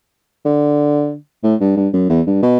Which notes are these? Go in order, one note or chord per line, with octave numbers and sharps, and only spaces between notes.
D3
A2
G2
G2
F#2
E2
G2
B2